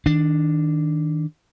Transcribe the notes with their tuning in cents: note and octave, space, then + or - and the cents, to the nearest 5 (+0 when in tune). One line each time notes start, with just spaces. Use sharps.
D#3 +20 D4 +0